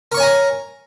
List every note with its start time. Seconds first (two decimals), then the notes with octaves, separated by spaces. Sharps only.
0.12 A#4
0.14 C#6
0.17 C#5
0.20 G#5
0.23 A#5